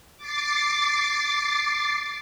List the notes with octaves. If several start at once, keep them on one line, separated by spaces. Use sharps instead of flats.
D6 A6 C7